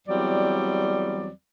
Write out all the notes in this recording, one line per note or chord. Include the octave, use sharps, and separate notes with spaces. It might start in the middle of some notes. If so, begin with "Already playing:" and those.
E2 F#3 G3 C4 D5